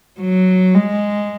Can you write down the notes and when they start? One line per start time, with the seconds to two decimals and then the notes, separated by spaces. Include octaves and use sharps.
0.20 F#3
0.75 G#3